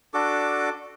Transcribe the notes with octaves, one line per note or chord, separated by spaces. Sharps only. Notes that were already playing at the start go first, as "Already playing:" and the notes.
D4 F#4 A4 D6